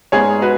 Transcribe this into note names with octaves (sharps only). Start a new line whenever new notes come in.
G#2 G#3 B3 G#4 C#5
F#4 B4